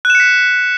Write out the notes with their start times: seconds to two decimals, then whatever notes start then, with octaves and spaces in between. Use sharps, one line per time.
0.05 F#6
0.10 E7
0.15 C#7
0.20 B6